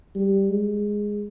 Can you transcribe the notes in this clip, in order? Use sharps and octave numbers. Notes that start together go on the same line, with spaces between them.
G3
G#3